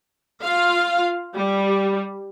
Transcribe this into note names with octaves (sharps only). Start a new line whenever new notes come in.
F4 F5
G3